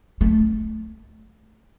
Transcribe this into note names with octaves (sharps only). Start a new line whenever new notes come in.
A3